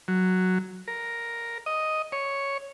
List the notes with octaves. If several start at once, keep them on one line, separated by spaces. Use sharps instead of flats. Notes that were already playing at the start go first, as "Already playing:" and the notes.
F#3
A#4
D#5
C#5